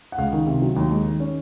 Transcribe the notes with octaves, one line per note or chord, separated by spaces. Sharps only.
F#5
C#2 F5
D#3
C3
F#3
D#2
G#3
D#3
C#4